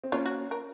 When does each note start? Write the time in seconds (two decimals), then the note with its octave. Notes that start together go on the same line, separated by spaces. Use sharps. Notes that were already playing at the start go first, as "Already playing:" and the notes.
0.04 C4
0.12 A#3 C#4 F4
0.26 F#4
0.51 A#4